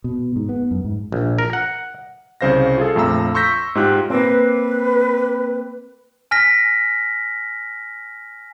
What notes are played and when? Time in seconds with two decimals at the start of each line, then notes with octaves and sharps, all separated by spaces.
0.04 B2
0.36 G#2
0.49 B3
0.71 F#2
0.85 G#2
1.12 A#1
1.39 A#4
1.53 F#5
2.41 C2 C#3 C5 F5 A#6
2.78 F4 G#4 A4
2.95 A#1 F2 A3 F5 A#5 E6
3.34 C6 C#6 E6 G6 A#6 B6
3.75 G#2 G#3 F4 G4 F#6
4.10 A#3 C4 B4
6.31 G#5 F6 A#6 B6